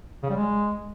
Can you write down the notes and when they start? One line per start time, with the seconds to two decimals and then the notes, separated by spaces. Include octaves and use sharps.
0.23 C#3
0.30 G3
0.37 G#3